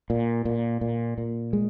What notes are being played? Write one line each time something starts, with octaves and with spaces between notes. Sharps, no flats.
A#2
A#2
A#2
A#2
G#3